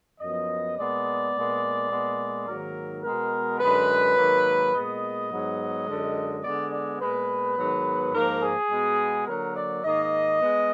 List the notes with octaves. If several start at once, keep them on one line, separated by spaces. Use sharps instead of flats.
F#2 F3 B3 D#5
A#2 G#3 B3 D5
A#2 G#3 B3
A#2 G#3 B3
G#2 D#3 F#3 A#3 A#4
B2 G#3 B3 A#4
F#2 D3 G#3 B4
G#2 D#3 F#3 A#3
A#2 G#3 B3 D#5
G#2 F#3 B3
F#2 D3 G#3
D3 G#3 B3 D5
D5
A#2 G#3 B3 B4
G#2 D#3 F#3 B3
G#2 F3 A#3 A#4
G#4
B2 G#3 B3
D3 F#3 A#3 A#4
D5
G#2 D#3 A#3 D#5
G#3 B3